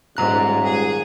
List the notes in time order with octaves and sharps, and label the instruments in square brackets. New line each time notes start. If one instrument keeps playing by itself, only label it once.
[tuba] D#1 [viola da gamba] G#2 G#3 [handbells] A#5 F#6
[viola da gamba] G#4